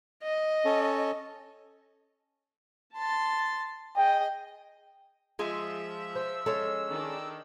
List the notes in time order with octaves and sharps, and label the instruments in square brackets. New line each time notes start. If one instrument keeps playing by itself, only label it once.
[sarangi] D#5
[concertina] C#4 A4
[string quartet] A5 C6 A6
[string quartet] G#4 D#5 [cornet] G5
[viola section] F3 E5 [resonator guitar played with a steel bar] G#3 F4 G#4
[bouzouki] C5 [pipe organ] E6
[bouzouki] G#3 C#4 [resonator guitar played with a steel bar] A4
[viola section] D#3 D4